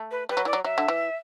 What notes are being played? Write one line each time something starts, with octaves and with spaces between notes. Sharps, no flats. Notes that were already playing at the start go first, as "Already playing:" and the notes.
Already playing: A3
B4
G3 B4
F#3
E3 D5
F#3
F#3 E5
D3
E3